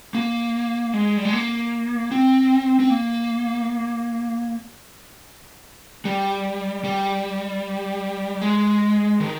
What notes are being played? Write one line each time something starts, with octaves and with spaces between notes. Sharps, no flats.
A#3
G#3
G3
G#3
A#3
C4
C4
A#3
G3
G3
G#3
D#3